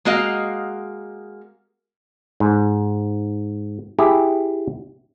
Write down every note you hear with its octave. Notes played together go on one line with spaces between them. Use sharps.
G#3 A#3 F#4 D#5 F5
G#2
E4 G4 G#4